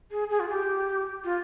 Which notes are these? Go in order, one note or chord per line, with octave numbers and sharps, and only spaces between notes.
G#4
G#4
F4
G4
F4